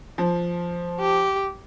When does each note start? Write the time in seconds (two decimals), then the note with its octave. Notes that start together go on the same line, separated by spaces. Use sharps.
0.18 F3
1.00 G4